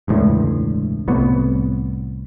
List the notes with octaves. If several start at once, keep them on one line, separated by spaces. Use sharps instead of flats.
E1 C#2 A2 D3
C2 A2 B3